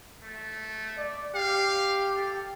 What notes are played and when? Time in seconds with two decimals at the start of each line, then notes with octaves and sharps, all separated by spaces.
0.23 A3
0.97 D5
1.35 G4 F5
2.16 A4